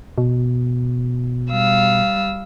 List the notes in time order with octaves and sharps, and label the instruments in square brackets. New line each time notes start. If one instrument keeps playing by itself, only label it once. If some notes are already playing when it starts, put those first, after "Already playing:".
[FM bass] B2
[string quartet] G3 F5 E6